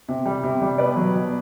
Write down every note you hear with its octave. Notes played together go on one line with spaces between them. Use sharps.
C3
G3
C3
G3
B2 B4 D5
F#3
B2